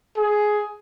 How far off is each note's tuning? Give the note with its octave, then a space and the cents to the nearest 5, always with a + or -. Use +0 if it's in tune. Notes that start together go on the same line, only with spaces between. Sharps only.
G#4 +10